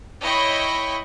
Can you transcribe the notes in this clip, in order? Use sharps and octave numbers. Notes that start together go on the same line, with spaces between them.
E4 C#5 D#5 G5 B5 C#6